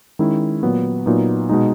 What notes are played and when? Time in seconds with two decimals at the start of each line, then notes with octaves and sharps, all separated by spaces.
0.19 D#3 G#3 C#4 E4
0.63 A#2 F#3 B3
1.06 A#2 F#3 B3 D#4
1.49 B2 G#3 D#4